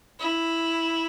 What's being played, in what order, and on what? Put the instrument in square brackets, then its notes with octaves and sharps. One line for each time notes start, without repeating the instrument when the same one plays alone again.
[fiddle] E4